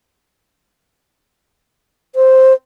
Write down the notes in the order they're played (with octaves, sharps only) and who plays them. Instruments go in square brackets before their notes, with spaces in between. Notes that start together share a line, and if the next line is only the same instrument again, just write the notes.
[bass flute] C5